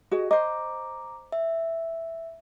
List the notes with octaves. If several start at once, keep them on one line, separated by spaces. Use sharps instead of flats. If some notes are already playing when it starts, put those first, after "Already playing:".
F#4 G#4 D#5
C5 D#5 A#5 D6
E5